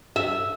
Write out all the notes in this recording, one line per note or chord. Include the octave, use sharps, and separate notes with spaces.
E5